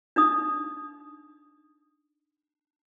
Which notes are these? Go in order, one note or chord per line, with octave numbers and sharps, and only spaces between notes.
D4 D#4 D#6